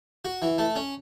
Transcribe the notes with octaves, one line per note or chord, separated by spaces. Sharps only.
F#4
E3
A3
C#4